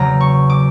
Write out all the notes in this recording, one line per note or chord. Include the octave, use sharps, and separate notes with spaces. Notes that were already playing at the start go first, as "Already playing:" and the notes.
Already playing: E2 C#3 F#3 A#3 A#5
C#6
D6